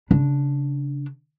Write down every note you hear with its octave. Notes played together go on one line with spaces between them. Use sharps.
C#3 D4